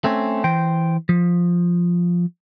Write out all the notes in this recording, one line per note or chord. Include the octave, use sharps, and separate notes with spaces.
A3 C4 C#4
E3 C5 G5
F3